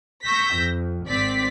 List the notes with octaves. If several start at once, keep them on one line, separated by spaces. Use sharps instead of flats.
C#6 E6 G6 A#6 B6
F2
G#1 C4 D5 B6